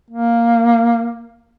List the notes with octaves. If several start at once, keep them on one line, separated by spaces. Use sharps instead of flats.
A#3